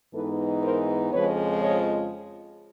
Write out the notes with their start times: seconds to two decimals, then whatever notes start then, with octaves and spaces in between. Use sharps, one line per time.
0.14 G#2 E3 G#3 B3 D#4 A4 B4
0.63 A#4 C5
1.12 F2 C#3 F3 G#3 B4 C#5
1.61 C#5 D#5